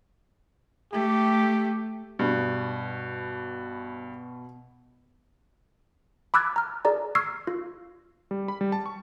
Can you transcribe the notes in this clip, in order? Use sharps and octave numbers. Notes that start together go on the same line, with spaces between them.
A3 G4
G2 B2
B5 D6 E6 F#6 G#6 A6
A#5 F6
G#4 D5 A#5
C#6 E6 F6 G#6 C7
F4
G3
B5
G3
A5
C#6